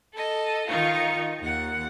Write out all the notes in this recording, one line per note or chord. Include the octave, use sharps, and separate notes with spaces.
A4 D#5
D#3 D#4 F4 C#6
D#2 F#5